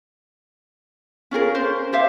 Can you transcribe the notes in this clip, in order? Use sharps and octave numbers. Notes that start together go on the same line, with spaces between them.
C#4 F4 G#4 A#4
C#4 C5
G4 C5 E5 F5